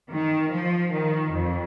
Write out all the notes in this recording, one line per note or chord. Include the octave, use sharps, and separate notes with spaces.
D#3
F3
D#3
F2